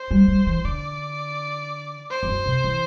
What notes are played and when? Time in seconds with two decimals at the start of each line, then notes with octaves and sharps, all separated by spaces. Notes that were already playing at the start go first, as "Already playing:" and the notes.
Already playing: C5
0.11 G3
0.28 G3
0.47 E3
0.65 D3 D5
2.10 C5
2.23 E2
2.28 F#2
2.46 C3
2.64 E3